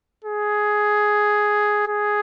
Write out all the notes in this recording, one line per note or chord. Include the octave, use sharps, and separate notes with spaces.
G#4
G#4